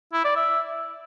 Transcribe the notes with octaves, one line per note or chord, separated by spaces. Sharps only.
E4
D5
E5